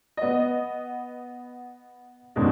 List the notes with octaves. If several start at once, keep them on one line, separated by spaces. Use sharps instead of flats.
B3 D#5
E2 G2 D#3 G3 G#3 C#4